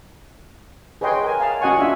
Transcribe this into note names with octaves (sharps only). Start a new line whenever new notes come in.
G#4 B4 C#5 D#5 G5 C6
A#4 G#5
F5 A5
C#4 F#4 D#5 F#5 G#5 C#6
D4 F4 E5